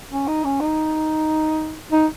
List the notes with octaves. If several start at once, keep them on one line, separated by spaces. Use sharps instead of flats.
C#4
D#4
C#4
D#4
D#4